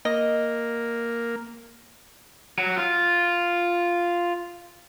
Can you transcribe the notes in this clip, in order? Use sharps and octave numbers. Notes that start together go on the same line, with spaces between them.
A#3 D#5
F#3
F4